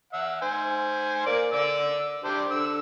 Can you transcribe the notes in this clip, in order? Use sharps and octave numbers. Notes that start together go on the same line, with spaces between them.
E5 F#5
C5 G#5
A#3 D5
D5 E6
D4 G4 C5
D3 E6